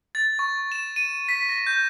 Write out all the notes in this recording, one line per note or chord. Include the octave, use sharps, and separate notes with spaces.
A6
C#6
E7
D#7
B6
A#6
G6